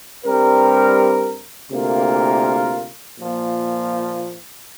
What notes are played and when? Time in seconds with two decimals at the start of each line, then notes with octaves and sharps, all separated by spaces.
0.24 G2 G3 C4 A#4
1.71 D2 C3 A#3 F4 A#4
3.19 A#2 F3 A#3